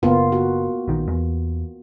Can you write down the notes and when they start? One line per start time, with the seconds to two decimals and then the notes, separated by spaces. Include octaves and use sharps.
0.03 F#1 A#3 B3 F4
0.32 F#4
0.88 A#1 D#3
1.07 E2